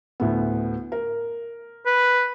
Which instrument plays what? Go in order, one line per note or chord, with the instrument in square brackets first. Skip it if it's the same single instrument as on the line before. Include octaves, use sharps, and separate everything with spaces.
[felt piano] D2 A2 B3
A#4
[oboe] B4